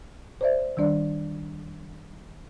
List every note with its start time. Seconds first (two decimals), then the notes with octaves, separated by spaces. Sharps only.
0.41 C5 D5 E5
0.77 D#3 G3 D4 D5